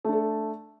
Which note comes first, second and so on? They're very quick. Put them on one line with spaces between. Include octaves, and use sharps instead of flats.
A3 D4 A4